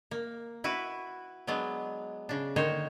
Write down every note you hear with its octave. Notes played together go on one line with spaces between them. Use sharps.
A#3
E4 F#4 B4
F#3 G#3 B3 D4
C#3 D4
D3 D#3 A#3 D#4 C5 C#5